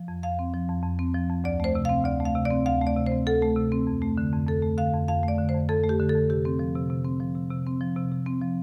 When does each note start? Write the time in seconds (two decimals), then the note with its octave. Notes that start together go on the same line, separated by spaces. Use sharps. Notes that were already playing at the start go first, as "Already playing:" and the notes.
Already playing: F3
0.08 F2
0.23 F2 F5
0.39 C4
0.54 F3
0.69 F2
0.83 F2
0.99 C4
1.14 F3
1.30 F2
1.44 D2 D5
1.60 A3 C5
1.75 C3
1.85 C4 F5
2.05 D2 D5
2.20 A3
2.25 F5
2.35 C3
2.45 D5
2.51 C4
2.66 D2 F5
2.81 A3
2.87 D5
2.96 C3
3.06 C5
3.12 C4
3.27 D2 A4
3.42 A3
3.56 C3
3.72 C4
3.87 F2
4.02 A3
4.18 D3
4.32 F2
4.47 F2 A4
4.62 A3
4.78 D3 F5
4.93 F2
5.08 F2 F5
5.23 A3 D5
5.38 D3
5.49 C5
5.54 F2
5.69 F2 A4
5.83 A3
5.89 G4
5.99 D3
6.09 A4
6.14 F2
6.29 C3 G4
6.45 C4
6.59 F3
6.75 C3
6.90 C3
7.05 C4
7.20 F3
7.35 C3
7.51 C3
7.67 C4
7.81 F3
7.97 C3
8.11 C3
8.27 C4
8.42 F3